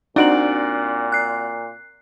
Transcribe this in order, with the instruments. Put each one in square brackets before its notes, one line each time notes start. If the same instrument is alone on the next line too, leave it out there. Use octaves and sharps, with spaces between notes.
[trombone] A#2 [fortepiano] C4 F#4 D5 [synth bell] D4 D7 F#7 [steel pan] D#4
[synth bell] F#6 C7